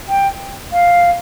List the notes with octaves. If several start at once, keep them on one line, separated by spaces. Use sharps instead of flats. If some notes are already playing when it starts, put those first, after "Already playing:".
G5
F5